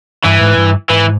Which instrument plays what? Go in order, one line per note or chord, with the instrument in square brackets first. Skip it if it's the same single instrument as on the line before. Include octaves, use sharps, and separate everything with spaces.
[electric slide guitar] G2 [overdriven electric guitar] E3
[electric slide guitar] G#2
G2
[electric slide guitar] G#2 [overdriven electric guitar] E3